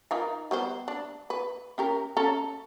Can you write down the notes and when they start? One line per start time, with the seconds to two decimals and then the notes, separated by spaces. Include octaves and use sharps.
0.11 D#4 F4 A#4
0.51 G3 B3 C5
0.88 D4
1.30 B4
1.78 C#4 G4 A#4
2.17 C#4 A4 A#5